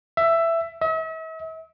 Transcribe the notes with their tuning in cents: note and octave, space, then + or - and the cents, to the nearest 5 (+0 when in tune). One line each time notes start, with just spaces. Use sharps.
E5 +10
E5 -45